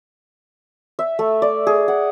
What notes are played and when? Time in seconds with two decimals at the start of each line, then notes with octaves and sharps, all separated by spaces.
0.99 E5
1.19 A3
1.42 D5
1.67 G#4
1.88 F#5